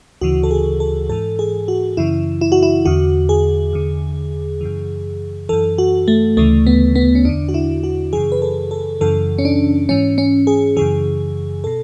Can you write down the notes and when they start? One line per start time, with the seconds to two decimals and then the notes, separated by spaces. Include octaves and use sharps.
0.21 D2 C#3 E3 F#4
0.43 A4
0.51 G#4
0.80 A4
1.09 G#2 E3 A4
1.39 G#4
1.68 F#4
1.97 F#2 C#3 E3 E4
2.41 E4
2.52 F#4
2.63 E4
2.85 E2 D3 F#4
3.29 G#4
3.73 E2 D3
4.61 F#2 C#3 E3
5.49 F#2 E3 A4
5.78 F#4
6.08 A3
6.37 D2 C#3 E3 A3
6.67 B3
6.95 B3
7.15 C#4
7.25 E2 D3 D4
7.49 F#4
7.54 E4
7.83 F#4
8.13 F#2 C#3 E3 G#4
8.32 B4
8.42 A4
8.71 A4
9.01 F#2 C#3 E3 A4
9.38 C#4
9.45 D4
9.89 G#2 E3 C#4
10.18 C#4
10.47 G#4
10.76 F#2 C#3 E3 G#4
11.64 B2 A4